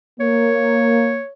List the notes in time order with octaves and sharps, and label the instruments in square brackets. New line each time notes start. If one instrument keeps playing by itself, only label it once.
[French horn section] A#3 [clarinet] C#5